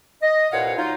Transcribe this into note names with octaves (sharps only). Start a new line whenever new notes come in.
D#5
C2 G2 A#2 C#5 F5 F#5
F#3 D#4 F4